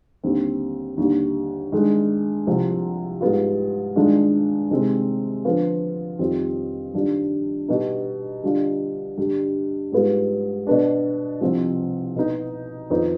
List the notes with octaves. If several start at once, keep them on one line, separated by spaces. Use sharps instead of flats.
D#2 D3 G3 C4
D#2 D3 G3
G2 D#3 G#3
C2 C3 F3
G#2 G3 B3 F4
G2 D#3 G#3 D4 F4
C3 D#3 G#3 C4
D3 F3 B3 F4
F2 D#3 G3 C4 F4
G2 D#3 G3 D4 F4
B2 G3 B3 D#4
D3 G3 D4 F4
G2 D3 G3
G#2 G3 B3 F4
B2 B3 D4
C2 C3 F3 C4
B2 B3 D#4
F2 D#3 B3 D#4